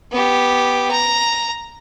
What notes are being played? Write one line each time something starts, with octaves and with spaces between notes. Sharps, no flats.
B3 G4
A#5